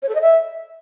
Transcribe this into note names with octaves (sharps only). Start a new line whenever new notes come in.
C#5
A4
D#5
E5